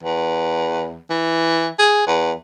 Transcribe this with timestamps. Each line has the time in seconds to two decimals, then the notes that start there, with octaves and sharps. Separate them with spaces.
0.03 E2
1.10 E3
1.79 G#4
2.07 E2